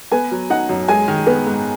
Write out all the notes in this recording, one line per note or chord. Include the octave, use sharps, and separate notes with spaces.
B3 G#5
F#3
D#4 F#5
F#2
G#3 G#5
D#3
B3
G#2